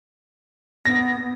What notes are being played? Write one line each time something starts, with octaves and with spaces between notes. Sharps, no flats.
B3 A#6